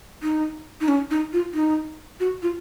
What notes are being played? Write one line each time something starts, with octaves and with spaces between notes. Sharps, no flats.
D#4
D#4
C#4
D#4
F4
D#4
F#4
F4